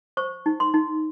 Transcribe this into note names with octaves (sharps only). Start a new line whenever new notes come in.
C5 C#6
D#4
C6
D#4